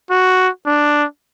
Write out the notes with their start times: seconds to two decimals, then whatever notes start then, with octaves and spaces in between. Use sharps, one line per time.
0.11 F#4
0.66 D4